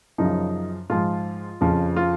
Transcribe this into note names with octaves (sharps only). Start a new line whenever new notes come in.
F#2 C#3 F3 D#4
G#2 F3 F4
F2 C#3 F3
F4